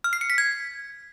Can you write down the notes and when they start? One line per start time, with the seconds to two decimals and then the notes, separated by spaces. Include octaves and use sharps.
0.04 F6
0.13 C7
0.21 C#7
0.30 B6
0.38 G#6